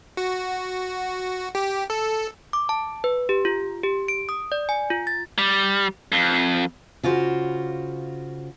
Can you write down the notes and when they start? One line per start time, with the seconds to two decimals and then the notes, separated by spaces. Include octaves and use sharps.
0.17 F#4
1.55 G4
1.90 A4
2.53 D6
2.69 A5
3.04 B4
3.29 G4
3.45 F4
3.84 G4
4.08 D7
4.29 D#6
4.52 D5
4.69 G#5
4.91 F4
5.07 A6
5.38 G3
6.12 F2
7.03 C#3 F4 F#4 C5